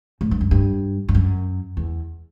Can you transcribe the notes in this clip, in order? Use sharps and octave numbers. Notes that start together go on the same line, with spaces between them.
A2
G2
F#2
G2
G2
F#2
E2